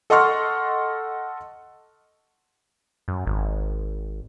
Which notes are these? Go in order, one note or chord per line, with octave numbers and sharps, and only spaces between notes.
A4 D#5 F#5 C6 C#6 F6
F#2
G#1